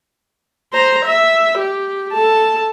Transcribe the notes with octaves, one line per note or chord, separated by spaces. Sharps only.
C5 A#5
E5
G4
A4 A5